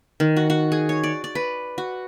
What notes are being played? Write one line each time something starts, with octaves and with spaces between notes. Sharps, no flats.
D#3
F#4
F#4
G#4
C#5
D5
D5
B4
F#4